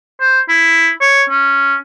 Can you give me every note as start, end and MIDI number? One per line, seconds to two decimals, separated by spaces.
0.20 0.40 72
0.49 0.89 64
1.01 1.23 73
1.29 1.76 61